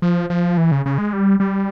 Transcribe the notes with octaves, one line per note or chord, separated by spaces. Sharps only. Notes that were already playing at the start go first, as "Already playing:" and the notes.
F3
F3
E3
C#3
C#3
G#3
G3
G3